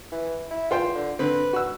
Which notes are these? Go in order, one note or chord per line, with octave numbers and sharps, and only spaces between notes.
E3
E4
E2 F4 C5 G5
D3
D3 C4 B4
F#4 E6